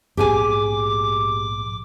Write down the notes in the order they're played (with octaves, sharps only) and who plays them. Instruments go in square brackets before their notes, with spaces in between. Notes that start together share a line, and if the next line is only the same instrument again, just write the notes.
[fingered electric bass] A#1 G#2 B3 [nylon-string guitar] G4 G#4 G#5 [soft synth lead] D6